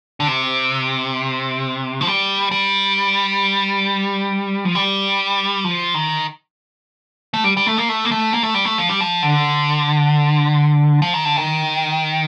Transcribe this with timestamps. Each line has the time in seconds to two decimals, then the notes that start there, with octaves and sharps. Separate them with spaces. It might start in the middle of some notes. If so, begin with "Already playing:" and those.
0.20 D3
0.27 C3
2.01 F3
2.07 G3
2.51 G3
4.65 F3
4.75 G3
5.64 F3
5.94 D#3
7.34 A3
7.44 G3
7.57 G3
7.66 A3
7.78 A#3
7.89 A3
8.05 A#3
8.11 A3
8.34 A#3
8.43 A3
8.54 G3
8.65 A3
8.78 F3
8.89 G3
9.01 F3
9.22 D3
11.02 F3
11.14 D#3
11.25 D3
11.37 D#3